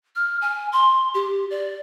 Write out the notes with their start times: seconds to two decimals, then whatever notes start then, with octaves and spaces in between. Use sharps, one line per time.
0.16 F6
0.42 G#5
0.72 C6
1.14 G4
1.51 D5